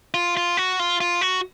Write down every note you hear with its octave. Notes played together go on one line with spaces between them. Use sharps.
F4
F4
F#4
F4
F4
F#4